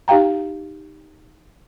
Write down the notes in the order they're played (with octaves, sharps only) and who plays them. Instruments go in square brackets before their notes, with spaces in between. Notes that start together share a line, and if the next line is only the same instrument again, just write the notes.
[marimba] D#4 G4 F5 G5 A#5